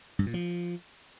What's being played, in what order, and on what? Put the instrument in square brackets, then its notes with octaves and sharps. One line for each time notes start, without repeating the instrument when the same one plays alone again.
[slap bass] G2
A#2
F3